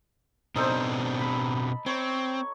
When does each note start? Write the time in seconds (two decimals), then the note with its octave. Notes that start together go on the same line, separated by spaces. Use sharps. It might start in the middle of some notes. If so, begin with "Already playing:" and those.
0.56 B2 C4 D4 D#4 A4 C5
1.19 B5
1.86 C4 C#5